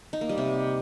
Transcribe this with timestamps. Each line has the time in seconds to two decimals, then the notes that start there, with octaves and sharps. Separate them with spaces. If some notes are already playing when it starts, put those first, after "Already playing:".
0.13 D#4
0.21 A#3
0.29 G3
0.38 C3